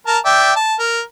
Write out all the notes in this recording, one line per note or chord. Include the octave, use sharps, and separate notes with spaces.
A#4 A5 A#5
D5 E5 G5
A5
A#4